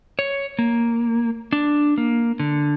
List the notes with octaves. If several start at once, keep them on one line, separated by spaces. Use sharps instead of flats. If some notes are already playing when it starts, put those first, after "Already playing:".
C#5
A#3
D4
A#3
D3